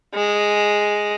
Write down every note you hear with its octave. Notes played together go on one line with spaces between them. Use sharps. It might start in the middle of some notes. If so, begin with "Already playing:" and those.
G#3